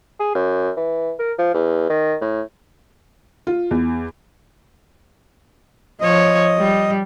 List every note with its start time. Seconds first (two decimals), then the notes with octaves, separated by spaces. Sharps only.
0.20 G#4
0.35 F#2
0.77 E3
1.19 A#4
1.38 F3
1.54 E2
1.90 D#3
2.21 A2
3.47 F4
3.71 E2
6.01 F3 C#5 D#5
6.58 G3